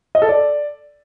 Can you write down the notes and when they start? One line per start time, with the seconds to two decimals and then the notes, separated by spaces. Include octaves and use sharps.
0.15 D#5
0.22 A4
0.29 D5